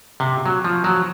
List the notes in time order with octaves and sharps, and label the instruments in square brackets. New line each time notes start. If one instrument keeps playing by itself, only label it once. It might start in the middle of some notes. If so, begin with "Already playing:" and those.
[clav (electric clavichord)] C3
F#3
F3
F#3